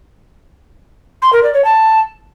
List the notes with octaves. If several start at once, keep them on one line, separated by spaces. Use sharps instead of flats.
C6
A#4
D5
C#5
A5